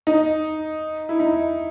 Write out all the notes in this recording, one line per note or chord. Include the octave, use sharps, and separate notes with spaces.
D#4
E4
D#4